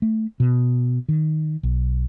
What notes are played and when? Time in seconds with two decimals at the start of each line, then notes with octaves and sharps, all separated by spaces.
0.02 A3
0.40 B2
1.09 D#3
1.63 B1